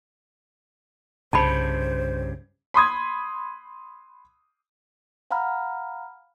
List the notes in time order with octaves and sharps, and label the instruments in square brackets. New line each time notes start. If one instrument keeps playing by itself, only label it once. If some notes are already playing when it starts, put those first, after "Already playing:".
[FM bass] C2 [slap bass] G2 C#3 [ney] C5 [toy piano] A5 B5
[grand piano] B5 C6 D#6 G#6
[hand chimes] F5 F#5 A#5 B5 F6